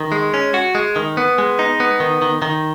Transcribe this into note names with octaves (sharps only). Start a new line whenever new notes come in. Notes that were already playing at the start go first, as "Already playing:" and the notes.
Already playing: D#3
G#3
C#4
F#4
G#3
D#3
B3
G#3
D#4
B3
D#3
D#3
D#3